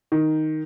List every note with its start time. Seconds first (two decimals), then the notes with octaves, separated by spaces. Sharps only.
0.12 D#3